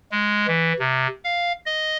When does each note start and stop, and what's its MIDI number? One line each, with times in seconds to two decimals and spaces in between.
0.11 0.47 56
0.47 0.73 52
0.79 1.07 48
1.24 1.52 77
1.66 1.97 75